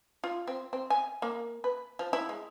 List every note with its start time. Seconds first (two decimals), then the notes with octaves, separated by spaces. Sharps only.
0.24 F4
0.48 C4
0.73 C4
0.90 G#5
1.22 A#3
1.64 B4
1.99 F3
2.13 E4
2.29 G#3